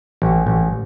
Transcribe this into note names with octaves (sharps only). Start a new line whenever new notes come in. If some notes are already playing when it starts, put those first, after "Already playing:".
A1
A1